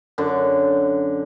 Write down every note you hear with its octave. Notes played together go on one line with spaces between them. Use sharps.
F#2 D3